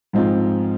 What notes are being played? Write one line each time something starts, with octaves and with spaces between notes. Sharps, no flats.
G#2 F3 G#3 C4 F4